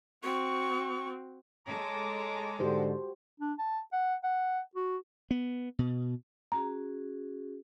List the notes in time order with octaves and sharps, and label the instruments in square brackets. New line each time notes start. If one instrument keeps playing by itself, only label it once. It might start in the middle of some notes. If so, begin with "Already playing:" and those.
[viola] C4 F#4 [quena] C#6
[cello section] G#3 A4 [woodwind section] C#5 A#5 D6
[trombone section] G#2 D3 [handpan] F#4 G4 C5
[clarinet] D4
A5
F#5
F#5
F#4
[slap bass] B3
B2
[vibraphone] C#4 F#4 G#4 [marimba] A#5